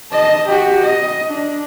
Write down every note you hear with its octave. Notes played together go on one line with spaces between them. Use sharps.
D#5 A5
F#4 G4
D#5
D4